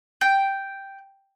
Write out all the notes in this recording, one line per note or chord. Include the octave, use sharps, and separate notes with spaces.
G5